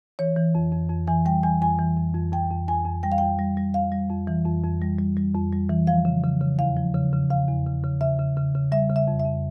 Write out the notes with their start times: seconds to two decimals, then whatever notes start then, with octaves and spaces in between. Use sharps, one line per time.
0.19 E3 C#5
0.36 E3
0.55 F2
0.72 F2
0.90 F2
1.07 E3 G#5
1.26 G3 G5
1.43 E3 G#5
1.61 F2 G#5
1.79 E3
1.96 F2
2.15 F2
2.32 F2 G5
2.51 F2
2.68 F2 G#5
2.85 F2
3.03 G3 G5
3.12 F5
3.18 F2 G5
3.39 G3
3.57 G3
3.74 F2 F5
3.92 G3
4.10 F2
4.27 E3
4.45 F2
4.64 F2
4.82 G3
4.99 G3
5.17 G3
5.35 F2
5.53 G3
5.70 E3
5.87 F3 F5
6.05 C#3
6.24 C#3
6.41 C#3
6.58 E2 F5
6.77 F3
6.94 C#3
7.13 C#3
7.30 C#3 F5
7.48 E2
7.66 C#3
7.84 C#3
8.01 C#3 E5
8.19 C#3
8.37 C#3
8.55 C#3
8.72 G3 E5
8.90 C#3
8.96 E5
9.08 F2
9.20 E5
9.25 F2